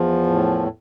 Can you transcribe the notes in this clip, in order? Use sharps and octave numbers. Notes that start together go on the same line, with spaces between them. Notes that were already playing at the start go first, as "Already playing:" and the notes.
Already playing: E2 F3
A2